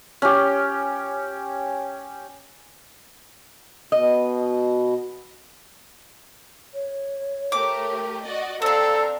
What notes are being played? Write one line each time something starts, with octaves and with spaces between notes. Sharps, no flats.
C#4 G4
B2 D#5
C#5
A3 G4 A#4 D6
F#4 D5 D#5
C4 D4 A4 D5 F5 G5 A#5